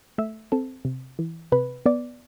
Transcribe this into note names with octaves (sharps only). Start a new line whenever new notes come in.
A3 E5
C4 A4
C3
E3
C3 B4
B3 D5